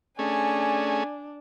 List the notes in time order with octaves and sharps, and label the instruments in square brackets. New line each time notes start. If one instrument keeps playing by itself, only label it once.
[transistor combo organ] A3 C#4 G#4 [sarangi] D4 [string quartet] G#5